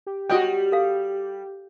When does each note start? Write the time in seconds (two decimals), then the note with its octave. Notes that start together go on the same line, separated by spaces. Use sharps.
0.06 G4
0.30 G3 F#4 D#5 G5
0.72 A4 F5